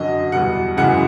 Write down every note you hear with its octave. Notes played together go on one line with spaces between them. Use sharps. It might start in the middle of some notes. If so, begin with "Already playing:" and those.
Already playing: F#2 D3 F#3 D#5
E2 B2 G3 F#5
F#2 C#3 E3 G#3 F#5